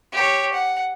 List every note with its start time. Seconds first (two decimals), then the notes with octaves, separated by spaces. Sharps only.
0.12 G4 C#5
0.53 F#5